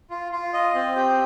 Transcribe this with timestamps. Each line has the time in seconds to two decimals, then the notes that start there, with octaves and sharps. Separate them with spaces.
0.10 F4
0.32 F4
0.53 D#5
0.74 C4
0.96 G4